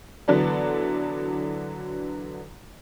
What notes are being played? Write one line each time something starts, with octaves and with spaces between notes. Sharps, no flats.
D3 E3 F#3 B3 A4 D5